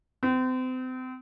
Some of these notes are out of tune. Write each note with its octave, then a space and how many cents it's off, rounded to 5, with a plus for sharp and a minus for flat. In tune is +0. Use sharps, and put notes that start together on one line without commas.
C4 -35